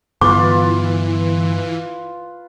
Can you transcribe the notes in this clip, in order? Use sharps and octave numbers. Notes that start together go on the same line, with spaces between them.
G2 D3 E3 B3 F4 B4 D6